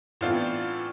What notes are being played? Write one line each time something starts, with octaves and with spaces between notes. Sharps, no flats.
A2 E3 B3 C4 D4 F4